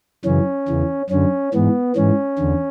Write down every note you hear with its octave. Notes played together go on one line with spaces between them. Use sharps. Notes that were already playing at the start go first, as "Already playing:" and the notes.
F#2 C#3 E3 C#4
E2 C#3 E3
F#2 D3 C#4
G#2 E3 B3
G#2 E3 C#4
E2 D3